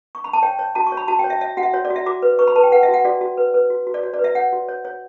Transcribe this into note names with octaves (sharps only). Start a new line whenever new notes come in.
C#6
B5
A5
C#5 G5
C#5
F#4 A5
C#6
C#5
B5
F#4 A5
G5
C#5
E5
C#5 E5
F#4 F#5
E5
F#4 C#5
D5
F#4
E5
F#4 D6
B4
B4 C#6
B5
B4 A5
G5
B4 F#5
E5
F#4
F#5
F#4 D5
F#4
B4
B4
F#4
F#4
D5
F#4 C#5
D5
B4
E5
C#5 F#5
F#4
C#5
C#5